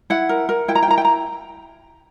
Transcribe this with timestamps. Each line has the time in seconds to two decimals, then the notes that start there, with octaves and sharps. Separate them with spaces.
0.10 E4 F#5
0.29 A#4
0.49 A#4
0.68 E4 G5
0.75 A#5
0.83 G5
0.88 E4 A#5
0.98 G5
1.05 A#5